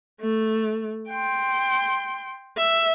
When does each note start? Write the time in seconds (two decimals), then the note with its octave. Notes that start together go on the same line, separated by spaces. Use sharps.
0.21 A3
1.09 G5 C6
2.57 E5